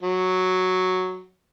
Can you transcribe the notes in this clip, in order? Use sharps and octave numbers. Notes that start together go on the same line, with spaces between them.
F#3